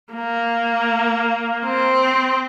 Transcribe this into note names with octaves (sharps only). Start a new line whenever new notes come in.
A#3
C4